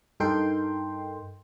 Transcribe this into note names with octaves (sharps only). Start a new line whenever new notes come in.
G2 D#4 A4 A#4 G5 C6